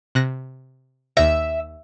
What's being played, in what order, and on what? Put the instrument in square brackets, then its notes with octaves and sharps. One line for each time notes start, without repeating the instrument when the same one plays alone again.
[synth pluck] C3 F#6 A#6
[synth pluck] D#2 A#6 [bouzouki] E5